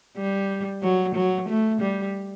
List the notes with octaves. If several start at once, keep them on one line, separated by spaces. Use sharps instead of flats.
G3
F#3
F#3
A3
G3